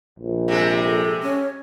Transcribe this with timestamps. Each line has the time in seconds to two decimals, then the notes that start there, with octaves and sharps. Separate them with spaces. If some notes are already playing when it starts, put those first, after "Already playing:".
0.19 A#1
0.48 C3 G#3
0.85 A4
1.23 C#4